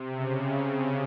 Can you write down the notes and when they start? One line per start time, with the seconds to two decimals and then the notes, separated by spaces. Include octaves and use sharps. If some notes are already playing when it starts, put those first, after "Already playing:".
Already playing: C3
0.11 C#3